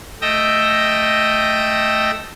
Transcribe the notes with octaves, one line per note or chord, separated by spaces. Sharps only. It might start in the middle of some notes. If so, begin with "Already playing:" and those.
A3 D#5 G5 E6 A#6